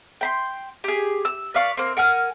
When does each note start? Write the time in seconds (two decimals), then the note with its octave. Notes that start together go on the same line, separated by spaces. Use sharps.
0.21 G5 B5 C6
0.84 G4 G#4
1.25 E6
1.54 B4 D5 F5 C#6
1.77 A#3 C4
1.97 A#4 F#5 G#5 F6